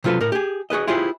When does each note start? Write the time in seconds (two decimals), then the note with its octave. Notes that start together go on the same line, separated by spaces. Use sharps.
0.04 C3 F#3 F4 A4 B4
0.21 A2 A#4
0.32 G4 G#4
0.70 F#4 G#4 B4 D#5
0.87 E4 F4 G4 G#4 B4 C5